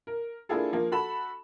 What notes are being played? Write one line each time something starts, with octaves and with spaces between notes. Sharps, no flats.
A#4
A#3 D4 E4 F4 G#4 A4
F3 A#3
F#4 A4 B5 E7